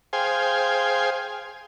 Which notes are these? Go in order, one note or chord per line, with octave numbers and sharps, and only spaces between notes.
G#4 C5 F5 G5 G#5